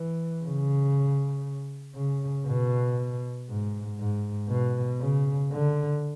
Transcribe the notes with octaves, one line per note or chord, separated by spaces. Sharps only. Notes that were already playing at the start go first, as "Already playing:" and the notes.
Already playing: E3
C#3
C#3
B2
G#2
G#2
B2
C#3
D3